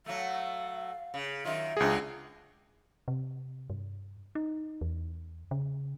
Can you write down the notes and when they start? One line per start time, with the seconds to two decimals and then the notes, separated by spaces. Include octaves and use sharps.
0.06 F#3 A3 F5
1.14 C#3
1.45 F#2 D#3 F4 E5
1.77 C#2 F#3 C4 D4 G#4
3.08 C3
3.70 G2
4.35 D#4
4.81 E2
5.51 C#3